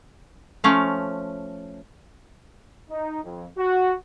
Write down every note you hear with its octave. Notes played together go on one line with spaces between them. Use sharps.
F3 A3 C#4 F5
D#4
F2
F#4